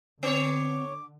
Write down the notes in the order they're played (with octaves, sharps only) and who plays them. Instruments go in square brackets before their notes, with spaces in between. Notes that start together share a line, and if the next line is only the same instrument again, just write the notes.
[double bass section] D3 [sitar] B3 C#5 [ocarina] C4 [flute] D6